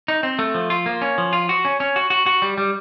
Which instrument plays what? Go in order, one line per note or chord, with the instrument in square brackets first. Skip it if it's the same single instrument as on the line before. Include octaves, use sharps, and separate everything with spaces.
[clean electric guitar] D#4
C4
A3
F3
F4
A#3
C#4
F3
F4
F#4
C#4
C#4
F#4
F#4
F#4
G3
G3